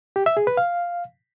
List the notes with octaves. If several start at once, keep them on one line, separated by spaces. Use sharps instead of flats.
G4
E5
G#4
B4
F5